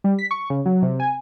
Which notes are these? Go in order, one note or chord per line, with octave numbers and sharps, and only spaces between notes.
G3
B6
C#6
C#3
F#3
C3
G#5